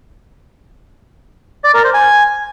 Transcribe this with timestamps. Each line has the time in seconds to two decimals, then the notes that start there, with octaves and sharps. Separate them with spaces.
1.64 D5
1.74 A#4
1.84 C5
1.94 G#5